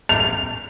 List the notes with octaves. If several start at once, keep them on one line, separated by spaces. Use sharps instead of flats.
F7